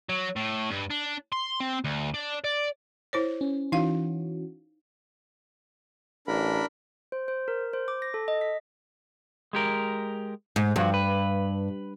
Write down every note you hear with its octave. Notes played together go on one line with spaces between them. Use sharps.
F#3
A2
G2
D4
C6
C4
D2
D4
D5
E4 C5 C#5
C#4
E3 C#4 D#4 F#4 F5
A1 D4 A#4 B5
C5
C5
A#4
C5
D6
A#6
A4
D#5
B6
G#3 G4 A#4
G#2
G2 F3 F#4
B4